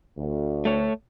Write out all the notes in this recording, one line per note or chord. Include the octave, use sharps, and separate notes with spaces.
D2
A3 C#5